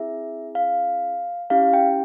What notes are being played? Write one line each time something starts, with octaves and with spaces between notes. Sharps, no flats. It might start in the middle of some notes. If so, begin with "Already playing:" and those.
Already playing: C4 E4 G#4 E5
F5
C#4 E4 G4 F5
G5